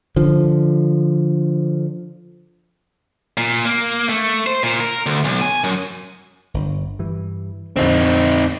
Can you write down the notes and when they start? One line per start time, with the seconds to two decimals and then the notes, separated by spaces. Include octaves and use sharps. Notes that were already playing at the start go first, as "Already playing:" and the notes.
0.16 D3 F3
3.38 A#2
3.65 A#3
4.09 A3
4.47 C5
4.63 A#2
4.80 A#4
5.06 D2
5.25 B1
5.42 G#5
5.64 F#2
6.54 G1
6.99 G2 E3
7.77 F2 A#2 D3 C4 D#4